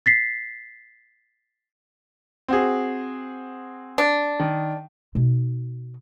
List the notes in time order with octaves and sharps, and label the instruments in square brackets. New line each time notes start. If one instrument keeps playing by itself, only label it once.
[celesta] A6 B6 C7
[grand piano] C4 F#4 G#4
[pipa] D4
[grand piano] D#3
[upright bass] B2 D#4